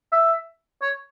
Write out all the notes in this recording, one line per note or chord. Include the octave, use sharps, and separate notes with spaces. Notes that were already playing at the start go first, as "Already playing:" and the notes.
E5
C#5